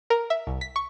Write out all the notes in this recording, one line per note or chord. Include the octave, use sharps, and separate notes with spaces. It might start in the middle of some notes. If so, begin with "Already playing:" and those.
A#4
E5
C2
B6
C#6